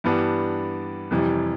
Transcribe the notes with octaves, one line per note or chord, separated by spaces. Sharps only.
G2 E3 G3 B3 D4
F2 C3 E3 G3